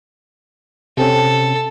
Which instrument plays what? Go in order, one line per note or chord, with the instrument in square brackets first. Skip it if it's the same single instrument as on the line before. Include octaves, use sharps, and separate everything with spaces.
[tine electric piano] C3 C4 C#4 [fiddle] A4